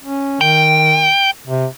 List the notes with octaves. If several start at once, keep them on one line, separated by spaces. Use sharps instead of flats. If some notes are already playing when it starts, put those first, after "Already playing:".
C#4
D#3 G5
C3